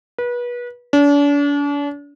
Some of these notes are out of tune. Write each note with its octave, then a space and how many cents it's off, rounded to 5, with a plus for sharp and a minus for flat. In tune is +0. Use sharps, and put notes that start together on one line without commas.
B4 -30
D4 -40